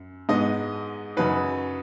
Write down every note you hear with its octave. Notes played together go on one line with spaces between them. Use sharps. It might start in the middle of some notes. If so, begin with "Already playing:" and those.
Already playing: F#2
G#2 G#3 B3 D#4 D#5
F#2 C#3 F#3 D#4 B4